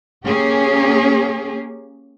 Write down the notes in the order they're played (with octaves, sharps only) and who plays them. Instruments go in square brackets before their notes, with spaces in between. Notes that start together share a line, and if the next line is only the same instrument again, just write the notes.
[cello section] A#3 C#4 G4 G#4